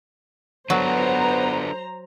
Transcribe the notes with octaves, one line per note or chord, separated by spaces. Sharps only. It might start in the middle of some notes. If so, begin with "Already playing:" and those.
F#3 B3 D4 A4 B4 C5 A#5